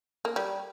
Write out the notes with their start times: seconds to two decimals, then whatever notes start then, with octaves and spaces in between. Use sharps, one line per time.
0.25 A#3
0.36 G3